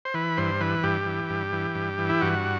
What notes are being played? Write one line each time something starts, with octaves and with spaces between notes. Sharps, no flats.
C5
E3 B4
G2 C5
E3 B4
G2 G4
E3
G2
E3
G2
E3
E4
G2 F#4